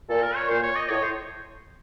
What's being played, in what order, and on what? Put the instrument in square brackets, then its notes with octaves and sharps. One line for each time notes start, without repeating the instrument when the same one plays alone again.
[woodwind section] A#2 [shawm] A4
[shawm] A#4
C#5
[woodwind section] A#2 [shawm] C5
[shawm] C#5
D#5
[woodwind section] A2 [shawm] C#5
[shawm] C5